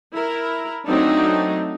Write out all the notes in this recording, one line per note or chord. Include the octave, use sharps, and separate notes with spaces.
E4 A#4
F#3 A3 C4 D4 D#4